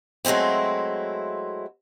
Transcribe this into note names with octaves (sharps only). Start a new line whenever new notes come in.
F#3 G#3 A3 C4 E4